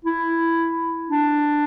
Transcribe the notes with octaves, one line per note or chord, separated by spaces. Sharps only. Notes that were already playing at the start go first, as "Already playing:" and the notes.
E4
D4